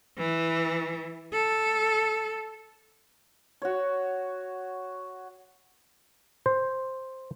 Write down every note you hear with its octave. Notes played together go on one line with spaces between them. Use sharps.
E3
A4
F#4 C#5
C5